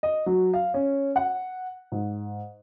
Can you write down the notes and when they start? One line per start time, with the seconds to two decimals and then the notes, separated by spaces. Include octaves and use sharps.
0.03 D#5
0.26 F#3
0.53 F5
0.74 C#4
1.16 F#5
1.92 G#2